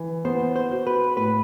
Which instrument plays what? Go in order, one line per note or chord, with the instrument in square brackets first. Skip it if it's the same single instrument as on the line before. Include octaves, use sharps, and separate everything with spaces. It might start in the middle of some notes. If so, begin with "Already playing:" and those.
Already playing: [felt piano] E3
[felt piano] B3 [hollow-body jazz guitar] C5
[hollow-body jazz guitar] C5
[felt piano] F#4
[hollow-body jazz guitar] B4
[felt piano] A2 [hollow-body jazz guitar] B4